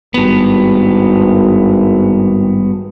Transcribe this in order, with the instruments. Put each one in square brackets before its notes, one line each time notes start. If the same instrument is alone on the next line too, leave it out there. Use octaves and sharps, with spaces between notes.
[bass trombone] G#1 [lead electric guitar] G2 B3